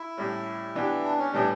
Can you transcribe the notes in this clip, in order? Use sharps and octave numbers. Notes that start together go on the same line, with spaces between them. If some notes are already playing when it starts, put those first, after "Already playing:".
Already playing: E4
A2 G3 C#4
E3 B3 D4 G4
D4
C#4
A2 E3 G3 D4